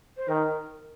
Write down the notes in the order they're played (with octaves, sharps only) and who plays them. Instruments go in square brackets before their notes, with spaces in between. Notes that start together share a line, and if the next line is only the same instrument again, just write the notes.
[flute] C5
[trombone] D#3 [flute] A#4